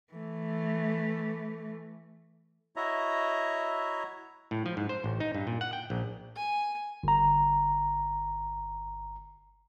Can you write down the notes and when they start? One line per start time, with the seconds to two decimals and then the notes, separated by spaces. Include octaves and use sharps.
0.13 E3 A3
2.76 E4 F#4 C#5 D#5 E5 A#5
4.51 A2
4.66 F3
4.77 G#2
4.89 C5
5.04 A1
5.20 D#4
5.35 G2
5.47 A#2
5.61 F#5
5.73 G5
5.90 A#1
6.36 G#5
7.03 G1 A#5